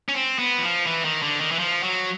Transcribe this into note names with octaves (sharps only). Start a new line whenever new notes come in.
C#4
C4
B3
E3
F3
E3
D#3
D3
D#3
E3
F3
F#3